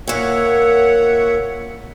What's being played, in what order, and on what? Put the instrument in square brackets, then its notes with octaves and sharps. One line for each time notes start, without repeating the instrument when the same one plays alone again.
[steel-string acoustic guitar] A#2 A#3 [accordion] C#5 E5 F#5